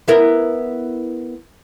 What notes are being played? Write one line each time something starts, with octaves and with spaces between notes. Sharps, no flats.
B3 E4 A#4